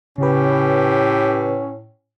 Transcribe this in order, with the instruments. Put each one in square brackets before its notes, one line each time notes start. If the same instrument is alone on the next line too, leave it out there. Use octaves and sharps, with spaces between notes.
[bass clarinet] A2 [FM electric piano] C#3 B4 [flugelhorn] C#4 [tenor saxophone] G4